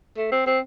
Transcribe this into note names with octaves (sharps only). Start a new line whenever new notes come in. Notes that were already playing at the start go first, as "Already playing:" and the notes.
A3
C4
C4